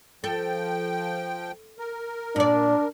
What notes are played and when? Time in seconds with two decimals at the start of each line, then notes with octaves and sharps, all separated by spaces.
0.24 F3 A4 G5
1.79 A#4
2.36 A#2 D4 D5